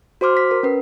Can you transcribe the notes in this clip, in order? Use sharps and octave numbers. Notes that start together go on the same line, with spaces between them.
F#4 C5 C6 D6 F6
B6
A#4
C#4 B4